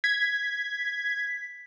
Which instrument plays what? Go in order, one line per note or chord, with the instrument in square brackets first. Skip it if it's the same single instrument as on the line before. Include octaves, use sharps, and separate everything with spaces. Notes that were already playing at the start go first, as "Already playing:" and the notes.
[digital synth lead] G#6 [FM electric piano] B6